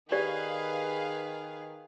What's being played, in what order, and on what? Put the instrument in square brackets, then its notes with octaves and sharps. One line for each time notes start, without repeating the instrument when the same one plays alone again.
[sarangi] D#3 [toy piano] G4 D5 C#6 [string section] G#4 B4 F5